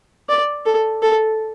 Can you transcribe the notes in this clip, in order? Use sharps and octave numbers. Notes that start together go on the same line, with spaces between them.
D5
A4
A4